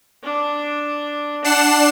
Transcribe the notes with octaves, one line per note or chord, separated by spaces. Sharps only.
D4
D4 F#5 C7 E7